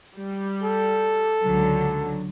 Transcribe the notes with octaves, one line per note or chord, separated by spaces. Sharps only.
G3
A4
C#2 D3 F#3